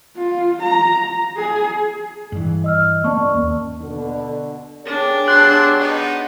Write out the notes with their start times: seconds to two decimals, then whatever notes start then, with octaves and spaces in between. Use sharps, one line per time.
0.17 F4
0.63 A#5
1.37 G#4
2.32 G2 E3
2.64 D#5 E6 F6
3.04 A#3 C#4 D5 A5 C#6
3.34 D#2
3.81 B2 D3
4.86 D4 G4 G#4 C#5
5.28 F#3 B3 C6 F#6
5.79 B3 D#4